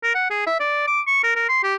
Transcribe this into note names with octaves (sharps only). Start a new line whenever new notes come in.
A#4
F#5
G#4
E5
D5
D6
C#6
A#4
A#4
C6
G4